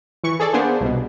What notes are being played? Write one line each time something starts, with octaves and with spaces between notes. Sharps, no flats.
E3 C#6
G#4 A4 D5
A#3 B3 D4 G#4 C5
C2 B2